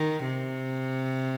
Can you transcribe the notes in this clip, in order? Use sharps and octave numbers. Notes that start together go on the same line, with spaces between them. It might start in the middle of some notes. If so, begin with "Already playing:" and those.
Already playing: D#3
C3